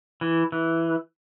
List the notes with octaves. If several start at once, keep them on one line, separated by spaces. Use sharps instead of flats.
E3
E3